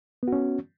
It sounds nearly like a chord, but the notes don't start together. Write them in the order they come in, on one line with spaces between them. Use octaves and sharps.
B3 F#4 C#4